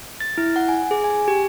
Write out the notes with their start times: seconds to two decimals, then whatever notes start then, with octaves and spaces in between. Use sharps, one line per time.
0.20 A6
0.38 E4
0.56 F#5
0.69 G#5
0.91 G#4
1.04 G#5
1.28 G4